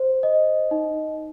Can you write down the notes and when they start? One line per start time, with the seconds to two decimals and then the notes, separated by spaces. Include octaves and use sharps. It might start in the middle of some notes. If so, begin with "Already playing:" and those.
Already playing: C5
0.23 D#5
0.71 D#4